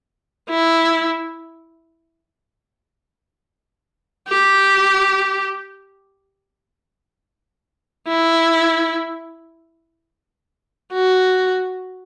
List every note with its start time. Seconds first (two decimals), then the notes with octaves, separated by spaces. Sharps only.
0.50 E4
4.28 G4
8.08 E4
10.93 F#4